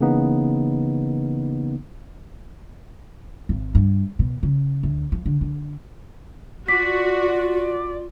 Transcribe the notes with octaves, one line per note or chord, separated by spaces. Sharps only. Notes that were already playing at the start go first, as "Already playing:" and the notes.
C#3 E3 A#3 B3 D#4
G#1
G2
B2
C#3
D2
F3
D3
D3
F4 F#4 D5 B6